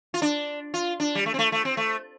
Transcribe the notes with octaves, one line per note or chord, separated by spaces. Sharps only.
F4
D4
F4
D4
G3
A3
C4
A3
A3
C4
A3